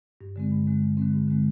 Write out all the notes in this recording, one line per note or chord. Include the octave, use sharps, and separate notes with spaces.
G2
D3 G#3 C4
G2
D3 G#3 C4
G2
D3 G#3 C4
G2
D3 G#3 C4